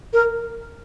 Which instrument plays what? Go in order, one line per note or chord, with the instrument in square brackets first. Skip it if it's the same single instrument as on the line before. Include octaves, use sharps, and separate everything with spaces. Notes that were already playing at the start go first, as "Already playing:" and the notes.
[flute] A#4